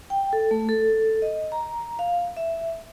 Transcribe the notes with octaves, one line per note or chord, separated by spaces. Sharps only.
G5
A4
A3
A4
D#5
A#5
F5
E5